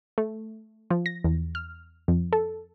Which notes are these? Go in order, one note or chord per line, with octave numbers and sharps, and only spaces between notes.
A3
F3
A#6
E2
F6
F2
A4